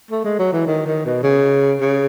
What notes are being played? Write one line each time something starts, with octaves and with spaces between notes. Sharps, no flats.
A3
G#3
F#3
E3
D#3
D#3
B2
C#3
C#3